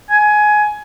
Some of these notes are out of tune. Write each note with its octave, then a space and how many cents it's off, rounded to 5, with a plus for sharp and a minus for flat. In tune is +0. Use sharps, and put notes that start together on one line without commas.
G#5 +20